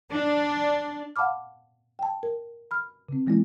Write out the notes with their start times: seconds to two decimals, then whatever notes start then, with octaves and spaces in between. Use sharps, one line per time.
0.11 D4
1.16 F5 F#5 A5 B5 D6 F6
1.99 G5 A5
2.23 A#4
2.71 B5 F6
3.09 C#3 C4
3.27 E3 G#3 A#3 B3 E4